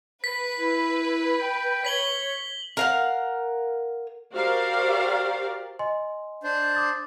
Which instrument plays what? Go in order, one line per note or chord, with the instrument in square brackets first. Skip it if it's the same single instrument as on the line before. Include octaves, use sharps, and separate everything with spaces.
[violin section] B4 [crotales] B6
[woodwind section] E4
G5
[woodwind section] C#5 [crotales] B6 F#7 G7
[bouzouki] A#4 F5 F#5
[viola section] F#4 G4 A#4 C5 D5 F5
[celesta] D#5 G#5 C6
[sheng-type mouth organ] D4 C5
[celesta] D6 D#6 A6